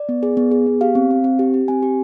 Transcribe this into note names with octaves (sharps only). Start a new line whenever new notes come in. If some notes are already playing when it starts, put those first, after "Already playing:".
Already playing: D5
B3
G#4
B3
G#4
B3
G4 F5
C4
C4
C4
G4
G4
C4 G#5
G4